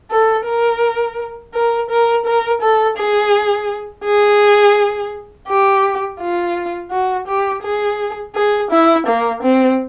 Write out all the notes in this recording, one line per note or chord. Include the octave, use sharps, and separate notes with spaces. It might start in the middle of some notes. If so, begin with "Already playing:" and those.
A4
A#4
A#4
A#4
A#4
A4
G#4
G#4
G4
F4
F#4
G4
G#4
G#4
E4
A#3
C4